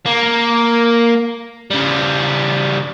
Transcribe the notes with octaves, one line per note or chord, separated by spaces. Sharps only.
A#3
C#3 G3